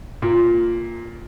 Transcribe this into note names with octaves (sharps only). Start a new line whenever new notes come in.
A#2